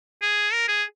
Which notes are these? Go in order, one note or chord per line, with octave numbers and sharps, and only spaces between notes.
G#4
A#4
G#4